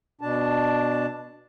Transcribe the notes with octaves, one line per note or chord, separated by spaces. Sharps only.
B2 D4 A5